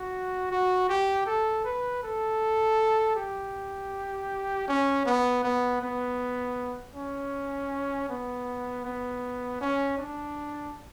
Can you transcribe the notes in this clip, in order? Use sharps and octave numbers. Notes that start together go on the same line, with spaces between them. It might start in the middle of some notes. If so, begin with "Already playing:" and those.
Already playing: F#4
F#4
G4
A4
B4
A4
G4
C#4
B3
B3
B3
C#4
B3
B3
C#4
D4